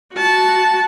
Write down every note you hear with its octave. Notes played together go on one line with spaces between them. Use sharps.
F#4 A5